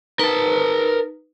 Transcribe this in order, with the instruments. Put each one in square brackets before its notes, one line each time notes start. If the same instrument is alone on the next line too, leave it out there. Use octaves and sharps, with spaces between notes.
[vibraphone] D#4 B4 [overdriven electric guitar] A#4 A5